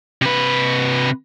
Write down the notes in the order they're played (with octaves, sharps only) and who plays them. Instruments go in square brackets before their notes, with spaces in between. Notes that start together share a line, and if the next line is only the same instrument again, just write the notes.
[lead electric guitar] C3 B4